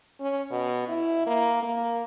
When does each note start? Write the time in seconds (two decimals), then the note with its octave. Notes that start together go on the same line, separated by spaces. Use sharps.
0.20 C#4
0.51 B2
0.88 E4
1.27 A#3
1.63 A#3